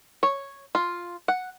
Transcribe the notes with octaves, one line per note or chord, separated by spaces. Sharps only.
C#5
F4
F#5